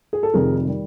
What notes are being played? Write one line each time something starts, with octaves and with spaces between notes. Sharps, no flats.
G#4
A4
F1 F2 C3 D#3 G#4 A#4
D#3 G3